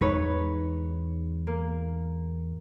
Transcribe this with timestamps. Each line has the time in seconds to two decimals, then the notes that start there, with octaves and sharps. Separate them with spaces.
0.01 E2 G#2 G#3 D#4 B4 C#5
1.47 A#3